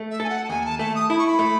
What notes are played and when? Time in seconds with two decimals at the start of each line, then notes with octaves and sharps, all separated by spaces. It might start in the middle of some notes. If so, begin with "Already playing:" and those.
Already playing: A3
0.11 E5
0.20 A4 G#5
0.29 F#5
0.44 A5
0.50 D#2 G#5
0.65 A5
0.79 A3 A5
0.95 D#6
1.10 E4 B5
1.18 C#6
1.26 B5
1.39 A3